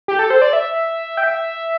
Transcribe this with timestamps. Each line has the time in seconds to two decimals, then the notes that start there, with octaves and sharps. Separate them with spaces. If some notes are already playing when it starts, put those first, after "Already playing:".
0.08 G4
0.19 A4
0.30 C5
0.42 D5
0.53 E5
1.17 G5
1.23 E5